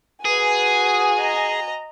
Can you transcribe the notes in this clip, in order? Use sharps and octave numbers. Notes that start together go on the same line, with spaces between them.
F#4 G#4 B4 G#5
D#5 A#5